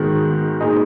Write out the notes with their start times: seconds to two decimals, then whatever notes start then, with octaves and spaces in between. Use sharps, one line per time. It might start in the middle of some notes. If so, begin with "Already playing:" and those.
Already playing: G#2 D#3 G#3 B3 F#4
0.60 A#2 G#3 D#4